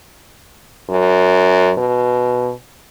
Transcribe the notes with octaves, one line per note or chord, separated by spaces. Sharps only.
F#2
B2